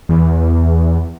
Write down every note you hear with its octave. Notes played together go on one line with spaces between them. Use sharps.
E2